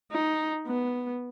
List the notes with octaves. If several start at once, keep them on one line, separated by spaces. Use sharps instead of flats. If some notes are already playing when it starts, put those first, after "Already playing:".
D#4
B3